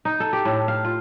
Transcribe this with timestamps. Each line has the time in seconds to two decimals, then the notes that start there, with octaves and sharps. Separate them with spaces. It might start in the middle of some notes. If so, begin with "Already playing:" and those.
0.05 D#4
0.20 A4
0.33 G4
0.45 A2
0.68 F5
0.85 F4